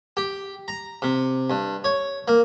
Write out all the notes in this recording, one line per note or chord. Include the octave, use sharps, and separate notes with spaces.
G4
A#5
C3
G2
C#5
A#3